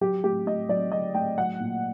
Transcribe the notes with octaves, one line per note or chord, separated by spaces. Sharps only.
F#3 G4
A2 G4
A2 D#5
F#3 D5
F#3 D#5
A2 G5
F#3 F#5
A#2